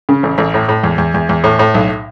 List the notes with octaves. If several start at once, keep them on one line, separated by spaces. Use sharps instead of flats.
C#3
A1
A1
A2
A2
E2
E2
E2
E2
A2
A2
B1